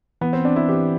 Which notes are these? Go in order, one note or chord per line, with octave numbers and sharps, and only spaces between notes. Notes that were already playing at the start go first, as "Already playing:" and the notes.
E3 B3
C4
C4 D4
E4
E3 G4